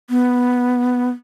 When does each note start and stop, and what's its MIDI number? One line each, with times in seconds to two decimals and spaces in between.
0.10 1.08 59